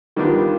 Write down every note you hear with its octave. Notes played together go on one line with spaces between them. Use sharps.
D#3 G3 B3 D4 F4